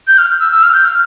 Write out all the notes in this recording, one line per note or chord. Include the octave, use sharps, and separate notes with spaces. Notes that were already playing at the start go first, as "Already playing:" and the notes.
G6
F6
E6
E6
F6
G6
F6